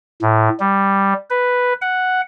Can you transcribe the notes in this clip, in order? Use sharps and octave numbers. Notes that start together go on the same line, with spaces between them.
A2
G3
B4
F#5